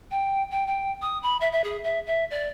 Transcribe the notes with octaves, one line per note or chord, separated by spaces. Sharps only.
G5
G5
G5
D#6
B5
E5
E5
G#4
E5
E5
D5